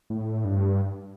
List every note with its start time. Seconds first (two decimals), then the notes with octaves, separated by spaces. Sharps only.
0.10 A2
0.45 G2